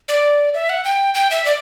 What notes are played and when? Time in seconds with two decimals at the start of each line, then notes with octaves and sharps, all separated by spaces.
0.08 D5
0.54 E5
0.69 F#5
0.85 G5
1.14 G5
1.31 E5
1.45 D5